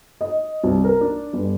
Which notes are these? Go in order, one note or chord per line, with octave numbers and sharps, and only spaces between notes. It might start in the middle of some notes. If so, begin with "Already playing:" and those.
D#5
C2
A#4
D4
G1